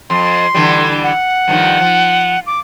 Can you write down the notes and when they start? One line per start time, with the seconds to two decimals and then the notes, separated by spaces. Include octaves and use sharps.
0.10 F2 C6
0.54 D3 E3 G3
1.03 F#5
1.48 G2 D#3 F3
1.80 F3
2.46 D6